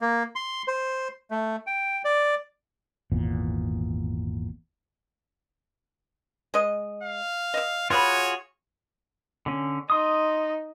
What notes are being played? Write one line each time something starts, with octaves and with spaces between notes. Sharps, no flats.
A#3
C6
C5
A3
G5
D5
G#1 E2 A#2
G#3 D#5
F5
D#5 E5
F4 F#4 G#4 C#5 F5 B5
D3 C#4
D#4 C6 D#6